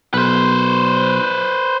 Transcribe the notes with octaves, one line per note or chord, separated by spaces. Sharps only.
B1 B4 C5